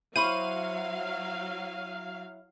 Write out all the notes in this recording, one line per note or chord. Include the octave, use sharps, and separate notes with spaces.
F#3 E4 C5 F5 B5 C#6 D#7